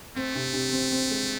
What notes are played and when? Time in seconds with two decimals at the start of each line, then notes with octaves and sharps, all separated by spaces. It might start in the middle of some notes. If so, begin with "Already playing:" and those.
0.16 A3 C4
0.35 C3
0.53 C3
0.72 C4
0.92 C4
1.11 G#3